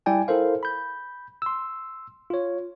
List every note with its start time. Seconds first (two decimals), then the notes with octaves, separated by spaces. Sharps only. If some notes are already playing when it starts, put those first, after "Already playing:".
0.06 G3 E4 D5 G5 G#5
0.28 E4 A4 A#4 C5 F5
0.63 B5 G6
1.42 C6 E6
2.30 F4 C#5